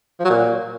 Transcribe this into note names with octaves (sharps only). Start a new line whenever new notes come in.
F3
F#3
A#2